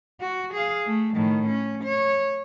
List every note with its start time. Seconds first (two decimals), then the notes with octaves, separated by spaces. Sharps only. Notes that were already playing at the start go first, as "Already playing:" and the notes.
0.21 F#4
0.53 G#4 F5
0.86 A3
1.16 A2 D#3
1.47 C#4
1.84 C#5